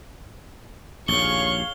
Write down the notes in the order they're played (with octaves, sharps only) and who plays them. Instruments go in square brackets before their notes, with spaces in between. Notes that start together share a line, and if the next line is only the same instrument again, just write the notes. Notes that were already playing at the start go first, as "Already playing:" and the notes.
[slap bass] A#1 D#2 [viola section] G#4 C#5 F5 [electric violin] C#6 [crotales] G7